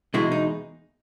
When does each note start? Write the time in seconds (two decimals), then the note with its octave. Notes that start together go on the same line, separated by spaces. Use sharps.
0.14 E2 B2 G#3 E4
0.32 D#4